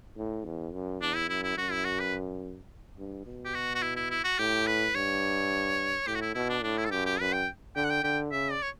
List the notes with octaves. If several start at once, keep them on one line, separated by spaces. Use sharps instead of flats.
A2
E2
F#2
E2 D4
E4
F#2 E4
E4
F#2 F#4
E4
F#4
B4
G2
B2
G4
F#4
F#4
E4
E4
E4
F#4
A2 G4
B4
G2 C#5
A2 G4
F#4
E4
B2 E4
D4
A2 D4
E4
A4
F#2 G4
G4
F#2 B4
G5
D3 G5
F#5
G5
D3 G5
C#3 E5
D5
C#5